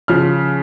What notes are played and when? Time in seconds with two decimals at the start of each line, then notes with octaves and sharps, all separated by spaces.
0.08 C#3 F3 F6